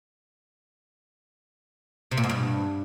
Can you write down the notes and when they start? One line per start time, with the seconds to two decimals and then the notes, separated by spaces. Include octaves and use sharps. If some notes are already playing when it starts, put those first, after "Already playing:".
2.11 C3
2.17 A#2
2.23 G#2
2.30 G2